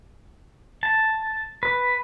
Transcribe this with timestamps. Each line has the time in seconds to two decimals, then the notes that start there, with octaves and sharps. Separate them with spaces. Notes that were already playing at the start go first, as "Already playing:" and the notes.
0.83 A5
1.63 B4